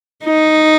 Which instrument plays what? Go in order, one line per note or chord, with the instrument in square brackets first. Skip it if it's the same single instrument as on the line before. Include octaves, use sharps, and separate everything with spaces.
[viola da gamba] D#4